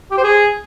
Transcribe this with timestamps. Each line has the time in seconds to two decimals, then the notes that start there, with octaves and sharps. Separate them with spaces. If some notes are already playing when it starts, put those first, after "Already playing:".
0.11 G4
0.17 C5
0.24 G#4